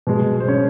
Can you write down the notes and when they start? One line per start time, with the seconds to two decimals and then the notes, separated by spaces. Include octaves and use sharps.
0.07 B2 G#3
0.40 C5
0.48 C#4 C#5